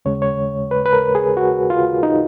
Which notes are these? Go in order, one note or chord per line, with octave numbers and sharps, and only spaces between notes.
D#2 C#3 G#3 C#5
C#5
B4
B4
A#4
G#4
F#4
F4
D#4